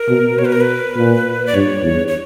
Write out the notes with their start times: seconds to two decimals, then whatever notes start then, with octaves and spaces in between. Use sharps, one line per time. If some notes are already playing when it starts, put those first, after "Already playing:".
Already playing: A#4
0.09 B2
0.38 B2 C#5
0.45 B4
0.52 A#4
0.61 B4
0.96 A#2
1.47 D5
1.54 G2 C#5
1.83 E2
2.08 C#5